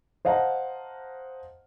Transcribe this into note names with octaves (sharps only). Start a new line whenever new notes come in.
C5 D#5 F5 F#5 A5 A#5